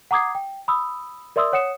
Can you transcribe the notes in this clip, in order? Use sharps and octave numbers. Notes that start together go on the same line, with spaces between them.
F#5 A#5 D6 D#6 G#6 C7
G5
B5 D#6 E6
A#4 D5 E5 C6 D#6 E6
C#5 F#5 D#6 C#7 E7